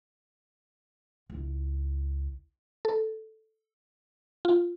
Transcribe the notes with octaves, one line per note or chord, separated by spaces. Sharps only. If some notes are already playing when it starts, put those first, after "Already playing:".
C#2 E4
A4
F4